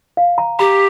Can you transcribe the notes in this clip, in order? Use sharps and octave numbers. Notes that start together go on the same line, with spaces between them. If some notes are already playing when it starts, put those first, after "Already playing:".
F5
A#5
G4 A#5